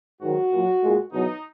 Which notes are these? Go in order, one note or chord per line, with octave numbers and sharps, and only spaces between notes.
G#2 D#3 F#3 F#4
A#2 F#3
A#2 G#3
E2 B2 F#3 D#4